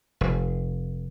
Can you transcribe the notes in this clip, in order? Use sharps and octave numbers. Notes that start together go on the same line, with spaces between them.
F1